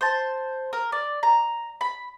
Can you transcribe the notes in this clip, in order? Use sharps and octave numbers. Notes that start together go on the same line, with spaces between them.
C5 A5
A#4
D5
A#5
B5